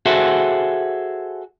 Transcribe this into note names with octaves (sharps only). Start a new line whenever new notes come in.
F#4 G#4 A4 C5 E5 F#5